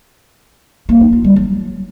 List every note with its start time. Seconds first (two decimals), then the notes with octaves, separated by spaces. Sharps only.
0.89 A#3
1.01 D#4
1.13 F4
1.24 G3
1.36 F#3